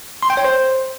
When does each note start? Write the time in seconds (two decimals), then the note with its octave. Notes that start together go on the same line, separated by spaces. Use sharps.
0.23 C6
0.30 G5
0.37 C#5
0.45 C5